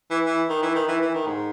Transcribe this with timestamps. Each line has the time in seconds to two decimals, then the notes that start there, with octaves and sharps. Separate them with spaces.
0.10 E3
0.26 E3
0.49 D#3
0.62 E3
0.75 D#3
0.88 E3
1.01 E3
1.14 D#3
1.27 G#2